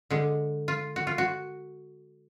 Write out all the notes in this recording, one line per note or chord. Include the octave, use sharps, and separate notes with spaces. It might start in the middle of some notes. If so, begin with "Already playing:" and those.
D3 G#3
F4
F#4
F4
F#4